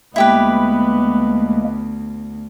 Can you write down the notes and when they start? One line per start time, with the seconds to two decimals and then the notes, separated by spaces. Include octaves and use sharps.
0.16 D2 G#3 A#3 B3 E4 G4 B4